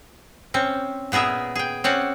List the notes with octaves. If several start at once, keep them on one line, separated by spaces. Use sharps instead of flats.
C4 C#4
A#2 B3 G#4 A#4 E5
G#4 G5
C4 C#4 D5 F#5